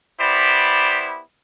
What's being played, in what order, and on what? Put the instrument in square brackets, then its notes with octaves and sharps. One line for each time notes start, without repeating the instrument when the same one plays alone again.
[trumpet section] B3 E4 G4 C5 D5